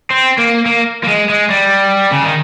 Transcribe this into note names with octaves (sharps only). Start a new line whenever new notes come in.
C4
A#3
A#3
A#3
G#3
G#3
G3
C#3
D#3